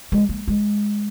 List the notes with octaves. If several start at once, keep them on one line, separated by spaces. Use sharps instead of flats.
G#3
A#3
G#3